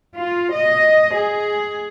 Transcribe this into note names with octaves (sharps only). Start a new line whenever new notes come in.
F4
D#5
G#4